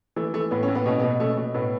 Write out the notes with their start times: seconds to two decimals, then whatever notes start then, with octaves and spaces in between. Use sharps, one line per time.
0.16 E3 A3
0.34 E3 A3
0.51 A2 B3
0.63 C#4
0.68 A2
0.75 B3
0.86 B2 C#4
0.99 B3
1.03 B2
1.20 B2 A3 C#4
1.37 B2
1.54 A2 B3